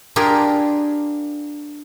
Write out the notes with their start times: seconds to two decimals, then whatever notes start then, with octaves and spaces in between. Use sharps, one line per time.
0.16 D4 F4 G4 G#4 A#4